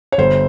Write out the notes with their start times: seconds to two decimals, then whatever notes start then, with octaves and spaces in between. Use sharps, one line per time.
0.12 C#5
0.18 G1 C5